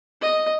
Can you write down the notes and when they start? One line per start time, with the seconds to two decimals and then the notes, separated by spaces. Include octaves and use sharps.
0.22 D#5